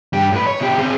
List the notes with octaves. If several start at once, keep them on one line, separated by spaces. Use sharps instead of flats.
G2 G4
A2 B4
C#5
B2 G4
C4 G#4